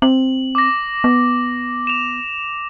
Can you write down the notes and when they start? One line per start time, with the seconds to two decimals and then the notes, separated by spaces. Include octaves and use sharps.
0.02 C4 F#7
0.55 D6 A#6
1.04 B3
1.87 E7 F7